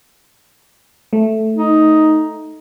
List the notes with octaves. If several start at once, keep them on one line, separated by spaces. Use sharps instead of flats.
A3
D#4